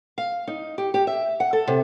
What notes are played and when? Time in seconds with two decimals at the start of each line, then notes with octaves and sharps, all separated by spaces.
0.18 F5
0.47 D#4
0.78 G4
0.94 G4
1.07 E5
1.40 F#5
1.53 A4
1.68 C3